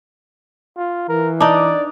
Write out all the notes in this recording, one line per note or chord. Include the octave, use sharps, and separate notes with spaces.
F4
E3 A#4
D4 D#4 D5